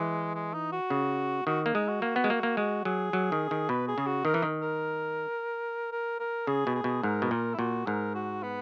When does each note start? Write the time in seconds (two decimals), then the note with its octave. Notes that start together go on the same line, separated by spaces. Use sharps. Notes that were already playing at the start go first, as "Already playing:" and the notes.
Already playing: E3 G#3
0.35 G#3
0.54 D#4
0.72 F#4
0.90 C#3
1.46 D#3 F#4
1.66 A#3
1.74 G#3 D#4
1.88 F#4
2.02 A#3
2.16 B3
2.24 G#3
2.30 A#3
2.43 A#3
2.57 G#3 F#4
2.85 F#3 G#4
3.13 F#3
3.32 D#3
3.51 D#3
3.69 B2 B4
3.88 G#4
3.98 C#3
4.07 F#4
4.25 D#3 A#4
4.34 E3
4.42 D#3
4.62 A#4
5.92 A#4
6.20 A#4
6.47 C#3 G#4
6.67 B2
6.75 G#4
6.84 B2
7.03 G#2 A#4
7.22 B2
7.31 A#2 A#4
7.54 E4
7.59 A#2 F#4
7.86 G#2 A#4
8.15 F#4
8.43 B3